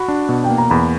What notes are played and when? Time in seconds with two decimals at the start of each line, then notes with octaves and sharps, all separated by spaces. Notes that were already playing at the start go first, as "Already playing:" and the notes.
Already playing: F#4 B5
0.08 D4
0.29 B2
0.44 G5
0.49 A#3
0.58 A#5
0.70 E2 B5